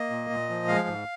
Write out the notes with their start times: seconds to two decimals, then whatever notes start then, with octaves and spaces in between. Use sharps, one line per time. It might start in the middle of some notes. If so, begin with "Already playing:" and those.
Already playing: A#3 D#5
0.10 A#2
0.30 A#2
0.49 F3
0.68 G#3 F5
0.87 G#2